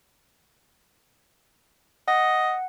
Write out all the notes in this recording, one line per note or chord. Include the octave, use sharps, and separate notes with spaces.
D#5 F#5